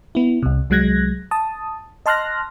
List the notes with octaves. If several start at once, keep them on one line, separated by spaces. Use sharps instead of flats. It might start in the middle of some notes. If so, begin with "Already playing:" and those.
B3 E4
C2 C3
C2 F#3 G#3 F#6 G#6 A#6
A5 D#6
D#5 A5 C6 F6 F#6 A#6